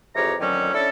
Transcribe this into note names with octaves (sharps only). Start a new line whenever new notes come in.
F2 G#2 E3 G4 C#5 A#5
F2 D3 D#3 F#3 A3 C#4
C#4 D4 E4 A4